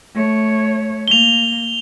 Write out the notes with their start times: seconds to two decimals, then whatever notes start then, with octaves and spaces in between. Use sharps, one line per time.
0.14 A3 C#5
1.08 A#3 F7 G7